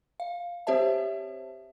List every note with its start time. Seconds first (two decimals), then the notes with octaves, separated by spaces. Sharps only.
0.20 F5
0.67 C4 G4 C5 C#5 E5 A5